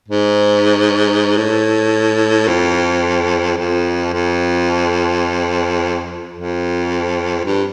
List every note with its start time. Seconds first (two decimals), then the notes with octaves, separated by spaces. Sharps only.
0.08 G#2
1.37 A2
2.48 F2
3.58 F2
4.13 F2
6.34 F2
7.44 G2